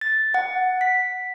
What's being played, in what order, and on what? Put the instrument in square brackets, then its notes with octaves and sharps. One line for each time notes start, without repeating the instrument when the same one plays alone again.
[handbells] A6
F#5
B6